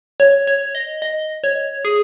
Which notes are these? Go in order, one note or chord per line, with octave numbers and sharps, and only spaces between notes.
C#5
C#5
D#5
D#5
C#5
G#4